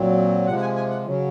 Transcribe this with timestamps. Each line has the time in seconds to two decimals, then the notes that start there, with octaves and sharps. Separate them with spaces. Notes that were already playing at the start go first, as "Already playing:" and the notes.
Already playing: A#2 F#3 C4
0.47 C3 F3 G#3 F#5
0.57 F#5
0.61 G#5
0.76 G#5
0.90 F#5
1.05 C#3 F#3 C#4